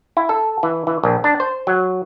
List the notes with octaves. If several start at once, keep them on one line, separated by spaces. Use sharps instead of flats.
E4
A4
E3
E3
A#1
D4
C5
F#3